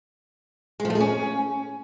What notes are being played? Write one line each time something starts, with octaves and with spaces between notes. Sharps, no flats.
G#3
F3
A3
G#4
C#4